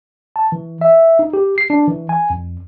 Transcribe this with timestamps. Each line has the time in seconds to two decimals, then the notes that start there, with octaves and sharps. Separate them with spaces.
0.36 A5
0.52 E3
0.81 E5
1.19 D#4
1.33 G4
1.58 C7
1.70 D4
1.88 E3
2.09 G#5
2.30 F2